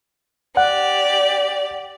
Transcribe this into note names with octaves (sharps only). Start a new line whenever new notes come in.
G4 D5 F#5